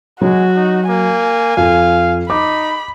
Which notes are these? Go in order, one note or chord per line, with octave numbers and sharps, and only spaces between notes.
F#3 G#3 F#4
D#4
A#3 G#5
F2 F5
D#4 B5 D6